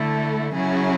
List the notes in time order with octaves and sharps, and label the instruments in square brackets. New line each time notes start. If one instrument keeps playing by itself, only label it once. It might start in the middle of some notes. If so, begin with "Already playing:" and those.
Already playing: [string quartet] D3 A3 E4 A4
C#3 F#3 C#4 E4 G#4